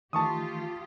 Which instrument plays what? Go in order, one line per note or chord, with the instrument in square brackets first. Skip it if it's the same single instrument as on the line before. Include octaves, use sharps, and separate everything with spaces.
[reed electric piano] D#3 E3 A3 [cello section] F4 G4 [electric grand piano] A5 C#6 D#6